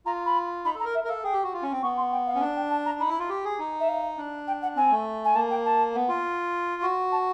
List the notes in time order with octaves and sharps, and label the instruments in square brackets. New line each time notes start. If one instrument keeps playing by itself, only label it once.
[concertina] F4 [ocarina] A#5
[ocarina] B5
[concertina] D#4 [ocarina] B5
[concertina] A4 [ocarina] A#5
[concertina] A#4
[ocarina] E5
[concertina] A#4
[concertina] A4 [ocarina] F5
[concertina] G#4 [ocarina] G5
[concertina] G4
F#4
F4
C#4
C4
[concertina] B3 [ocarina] C#6
[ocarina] C6
G5
F5
[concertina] C#4
D4
[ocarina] G5
A5
A#5
[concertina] D#4 [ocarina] B5
[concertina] E4
F4
G4
G#4
D#4
[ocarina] E5
F5
[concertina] D4
[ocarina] G5
F#5
[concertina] C4 [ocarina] G#5
[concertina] A3
[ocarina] G#5
[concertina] A#3 [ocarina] A5
[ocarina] G5
A5
[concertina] B3
F4
F#4
[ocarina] A5